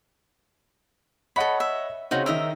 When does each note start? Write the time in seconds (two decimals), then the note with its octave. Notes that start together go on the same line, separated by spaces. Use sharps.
1.36 A4 C#5 D#5 F#5 B5
1.60 E5
2.11 C#3 C4 C#4 D#4 F#4
2.26 D#3 A#4 D#5 E5 E6